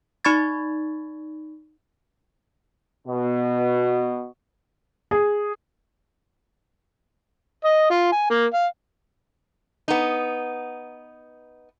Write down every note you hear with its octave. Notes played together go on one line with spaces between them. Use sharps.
D#4 D5 B5 C#6 G#6 A6
B2
G#4
D#5
F4
G#5
A#3
F5
B3 D#4